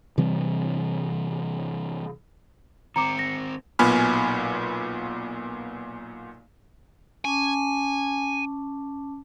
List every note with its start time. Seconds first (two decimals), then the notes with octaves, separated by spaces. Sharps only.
0.18 C3 E3 G3 C4
2.96 D#3 C4 A#5 D6 C#7
3.19 A#6
3.79 B1 A#2 B3 G#5 B5 F6
7.25 C#4 G#5 A5 D6